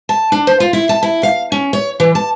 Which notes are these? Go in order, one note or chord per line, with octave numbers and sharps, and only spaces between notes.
A5
D4
C5
F4
E4
A5
E4
F5
C#4
C#5
E3
A5